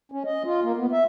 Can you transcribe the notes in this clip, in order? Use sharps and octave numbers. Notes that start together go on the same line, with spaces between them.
C#4
D#5
F4
A#3
B3
E5